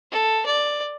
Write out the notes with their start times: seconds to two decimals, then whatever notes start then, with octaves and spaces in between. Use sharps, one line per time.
0.12 A4
0.46 D5